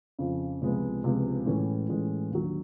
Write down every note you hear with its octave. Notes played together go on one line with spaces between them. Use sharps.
F2 C#3 F3
C#2 C3 F3 G#3 B3
C#2 C3 F3 G#3 B3
A2 E3 G#3 C#4
A2 E3 G#3 C#4
D#2 D3 F#3